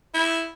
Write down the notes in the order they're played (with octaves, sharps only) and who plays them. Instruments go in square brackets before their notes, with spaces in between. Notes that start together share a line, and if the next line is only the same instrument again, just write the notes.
[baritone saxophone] E4